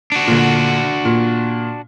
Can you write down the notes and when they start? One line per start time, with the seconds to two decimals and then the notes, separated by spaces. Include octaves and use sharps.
0.12 D4 F#4
0.27 A#2 D3
1.05 A#2